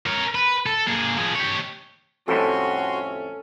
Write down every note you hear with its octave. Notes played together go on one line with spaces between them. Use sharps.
A#4 C#5
B4
A4
A#3 G#4
F3 G#4
G4 C#5
F2 A2 G3 C#4 F#4 A4 C6 E6